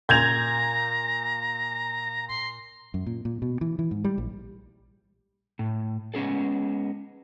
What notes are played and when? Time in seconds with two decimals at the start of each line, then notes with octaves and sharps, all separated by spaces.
0.09 A#2 A#5 G6 G#6 F7
2.28 C6
2.94 F#2
3.06 A#2
3.25 A#2
3.42 B2
3.61 E3
3.79 E3
3.91 G#2
4.04 G3
4.18 A#1
5.59 A2
6.14 G#3 B3 C#4 G#4 A4